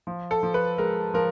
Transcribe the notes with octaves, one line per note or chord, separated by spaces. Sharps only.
F3
A4
F3
B4
G#3 A#4
F3 A#4